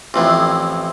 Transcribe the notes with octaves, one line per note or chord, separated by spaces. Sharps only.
A1 F2 A2